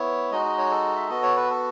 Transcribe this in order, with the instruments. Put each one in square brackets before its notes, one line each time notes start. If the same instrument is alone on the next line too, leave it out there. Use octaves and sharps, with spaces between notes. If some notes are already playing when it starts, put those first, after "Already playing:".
Already playing: [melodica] B3 E4 C#5
G#3 D#4 F#4 D#5
D#5
C#5
A4
E5
B3 F#4 D#5
C#5
B4
A4